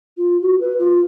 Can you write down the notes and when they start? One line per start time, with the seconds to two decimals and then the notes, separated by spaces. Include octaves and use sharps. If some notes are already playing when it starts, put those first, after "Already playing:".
0.17 F4
0.41 F#4
0.61 B4
0.79 F4